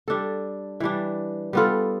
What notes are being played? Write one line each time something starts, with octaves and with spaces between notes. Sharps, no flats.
G3 D4 A4
E3 G3 D4
G3 B3 F4 A4